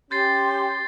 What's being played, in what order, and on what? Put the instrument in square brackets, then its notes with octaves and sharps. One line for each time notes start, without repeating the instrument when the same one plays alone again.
[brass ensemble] C#4 [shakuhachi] G4 [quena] C6 [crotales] G6 A6 C7